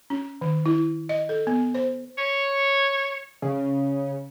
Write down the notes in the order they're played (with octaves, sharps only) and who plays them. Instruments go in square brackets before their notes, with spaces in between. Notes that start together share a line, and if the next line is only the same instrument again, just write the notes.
[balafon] C#4
D#3
E4
D#5
A4
B3
C5
[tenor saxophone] C#5
[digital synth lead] C#3